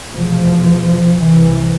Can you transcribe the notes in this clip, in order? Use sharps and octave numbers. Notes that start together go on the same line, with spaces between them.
F1 E2 B2 F3
C2 C3 E3